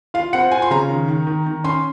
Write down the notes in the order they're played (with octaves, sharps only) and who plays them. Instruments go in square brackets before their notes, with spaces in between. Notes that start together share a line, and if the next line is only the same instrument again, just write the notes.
[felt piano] F4 F5
C4 F#5
F4 G#5
C6
C#3 A#5
D#3
D#3
D#3
D#3
C#4 C6